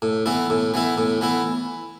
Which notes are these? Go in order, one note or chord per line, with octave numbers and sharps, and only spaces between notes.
A2
E3 B3 E4
A2
E3 B3 E4
A2
E3 B3 E4